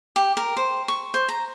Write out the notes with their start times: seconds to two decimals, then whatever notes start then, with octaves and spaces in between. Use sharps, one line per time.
0.16 G4
0.37 A#4
0.57 C5
0.88 C#6
1.14 C5
1.29 A#5